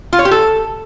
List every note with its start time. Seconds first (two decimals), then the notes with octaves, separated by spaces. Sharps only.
0.13 F4
0.19 C#5
0.25 G4
0.31 A4